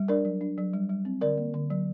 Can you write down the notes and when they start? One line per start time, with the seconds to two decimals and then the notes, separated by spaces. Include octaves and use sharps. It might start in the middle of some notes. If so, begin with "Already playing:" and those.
Already playing: G3
0.08 D4 A#4 D5
0.25 F#3
0.41 D4
0.58 F#3
0.73 G3
0.89 G3
1.05 C4
1.21 D3 A#4 D5
1.38 A#3
1.54 D3
1.70 F#3